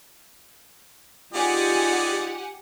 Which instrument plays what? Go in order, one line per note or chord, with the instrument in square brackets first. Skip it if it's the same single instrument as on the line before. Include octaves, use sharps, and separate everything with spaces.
[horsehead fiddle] D#4 F4 [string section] G4 F#5 G#5 [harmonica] G#4 D5